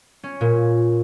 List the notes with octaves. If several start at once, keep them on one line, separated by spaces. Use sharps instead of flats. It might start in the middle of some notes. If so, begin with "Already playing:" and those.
C#4
A#2